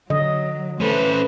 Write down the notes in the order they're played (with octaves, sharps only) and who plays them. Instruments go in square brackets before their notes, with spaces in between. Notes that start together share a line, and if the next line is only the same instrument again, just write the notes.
[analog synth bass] D3 [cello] F#3 [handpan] D#5
[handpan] A3 [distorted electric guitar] C#4 A4 [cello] B4 C5